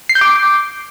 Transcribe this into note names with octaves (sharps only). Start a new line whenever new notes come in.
C7
G6
D6